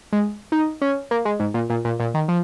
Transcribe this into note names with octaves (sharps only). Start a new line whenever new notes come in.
G#3
D#4
C#4
A#3
G#3
G#2
A#2
A#2
A#2
A#2
D#3
F3